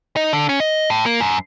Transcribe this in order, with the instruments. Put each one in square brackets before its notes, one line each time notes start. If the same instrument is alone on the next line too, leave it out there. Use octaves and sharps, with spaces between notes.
[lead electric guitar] D#4
D3
C#4
D#5
A2
A#3
F#2